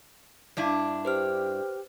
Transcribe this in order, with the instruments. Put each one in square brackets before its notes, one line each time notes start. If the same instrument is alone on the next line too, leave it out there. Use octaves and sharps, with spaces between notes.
[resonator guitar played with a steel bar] G2 D4 E4
[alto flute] G4 [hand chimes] B4 C5 F6